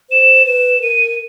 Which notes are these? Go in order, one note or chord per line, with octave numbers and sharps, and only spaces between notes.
C5 E7
B4 E7
A#4 D#7